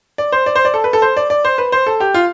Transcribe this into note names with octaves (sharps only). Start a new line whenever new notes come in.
D5
C5
D5
C5
D5
A4
B4
A4
C5
D5
D5
C5
B4
C5
A4
G4
F4